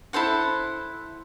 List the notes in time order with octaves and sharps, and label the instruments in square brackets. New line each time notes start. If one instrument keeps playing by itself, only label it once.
[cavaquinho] E4 A4 C5 F#5